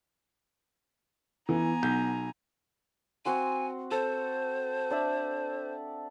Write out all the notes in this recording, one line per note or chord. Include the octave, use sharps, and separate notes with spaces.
E3 B3 G#5 A#5
B1 G6
C4 F#4 G#5 C6
A4 C5
D4 D5 E5